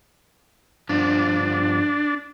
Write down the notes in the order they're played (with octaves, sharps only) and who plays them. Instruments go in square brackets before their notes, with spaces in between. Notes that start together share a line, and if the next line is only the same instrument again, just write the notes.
[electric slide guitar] G2 F3 B3 [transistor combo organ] D4